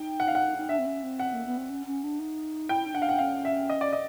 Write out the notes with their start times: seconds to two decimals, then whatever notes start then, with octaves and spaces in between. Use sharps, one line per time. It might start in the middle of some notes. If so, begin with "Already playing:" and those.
Already playing: D#4 G5
0.20 F#5
0.28 F5
0.35 F#5
0.58 D#4
0.69 D4 E5
0.78 C4
0.86 C#4
1.03 C4
1.19 F#5
1.33 A#3
1.46 B3
1.57 C4
1.70 C#4
1.86 C#4
2.03 D4
2.19 D#4
2.69 E4 G5
2.86 D#4
2.94 D4 F#5
3.02 F5
3.09 F#5
3.19 C#4 F5
3.45 E5
3.70 D#5
3.81 D5
3.93 D#5